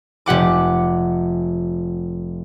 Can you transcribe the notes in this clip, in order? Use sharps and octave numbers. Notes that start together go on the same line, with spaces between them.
F1 G4 F#5 D6